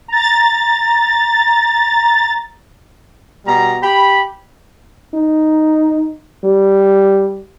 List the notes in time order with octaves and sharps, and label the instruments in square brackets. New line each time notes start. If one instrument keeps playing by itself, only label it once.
[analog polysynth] A#5 A6
[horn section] B2 G3 A#5
G4 B5
[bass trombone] D#4
G3